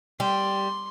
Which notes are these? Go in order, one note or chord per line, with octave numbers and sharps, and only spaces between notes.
G3 C6